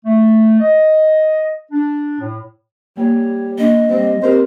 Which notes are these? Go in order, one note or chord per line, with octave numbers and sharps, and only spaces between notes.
A3
D#5
D4
A2
G3 A#3 C#5
A#3 D4 D#5
G3 C4
C4 G4 A#4 C5